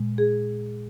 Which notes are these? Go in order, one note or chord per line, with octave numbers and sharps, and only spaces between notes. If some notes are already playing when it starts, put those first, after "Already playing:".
Already playing: A#2 G#3
G#4